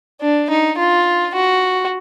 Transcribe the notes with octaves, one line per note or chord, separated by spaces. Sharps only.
D4
D#4
F4
F#4